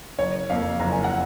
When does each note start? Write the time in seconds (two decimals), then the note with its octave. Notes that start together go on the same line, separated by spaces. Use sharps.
0.18 F#1 C#5
0.49 F2 F3 A#3 F5
0.79 F#1 A#5
0.92 G#5
1.04 F#5